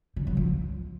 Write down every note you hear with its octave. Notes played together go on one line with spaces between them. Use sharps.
C#3
F#3
F3